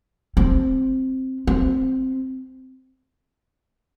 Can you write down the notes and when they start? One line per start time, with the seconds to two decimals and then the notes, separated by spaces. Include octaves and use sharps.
0.37 C4
1.47 C4